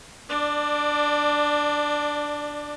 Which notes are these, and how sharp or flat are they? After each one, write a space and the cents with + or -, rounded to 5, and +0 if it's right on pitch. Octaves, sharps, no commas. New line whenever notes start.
D4 +0 D5 +25